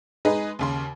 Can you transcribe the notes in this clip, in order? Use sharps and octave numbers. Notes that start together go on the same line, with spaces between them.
G#3 D#4 G#4 B4 D#5
D#2 C#3 C6